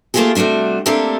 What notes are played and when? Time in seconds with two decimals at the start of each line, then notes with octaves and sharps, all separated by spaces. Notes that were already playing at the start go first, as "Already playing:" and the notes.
0.14 A3 A#3 D4 F4 G4 G#4
0.35 C3 G3 A3 D4 F#4
0.86 A3 A#3 C4 D4 G4 A4